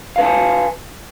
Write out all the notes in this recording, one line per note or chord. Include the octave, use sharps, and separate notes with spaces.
B4 F5 G#5 A5